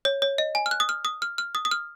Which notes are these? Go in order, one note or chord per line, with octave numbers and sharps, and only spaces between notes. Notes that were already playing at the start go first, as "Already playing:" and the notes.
C#5
C#5
D#5
G#5
F6
F#6
D#6
F6
D#6
F6
F6
D#6
D#6
F6